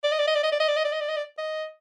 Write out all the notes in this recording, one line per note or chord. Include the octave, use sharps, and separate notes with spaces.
D5
D#5
D5
D#5
D5
D#5
D5
D#5
D5
D#5
D5
D#5
D5
D#5
D5
D#5